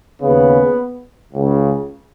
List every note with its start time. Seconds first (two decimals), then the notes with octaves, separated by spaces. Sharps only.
0.21 D#2 C#3 B3
1.33 C#2 C#3